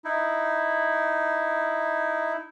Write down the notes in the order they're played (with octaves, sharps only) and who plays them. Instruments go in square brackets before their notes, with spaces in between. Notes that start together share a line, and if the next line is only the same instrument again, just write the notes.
[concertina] D#4 E4